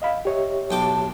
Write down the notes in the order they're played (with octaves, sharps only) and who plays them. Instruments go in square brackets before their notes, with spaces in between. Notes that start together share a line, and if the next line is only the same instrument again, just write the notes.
[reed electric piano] D#5 F5 B5
[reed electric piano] G4 C#5 E5 [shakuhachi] D#5
[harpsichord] B1 G5 D6 [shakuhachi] A5